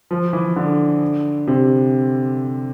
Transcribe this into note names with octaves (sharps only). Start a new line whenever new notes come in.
F3
E3
D3
C3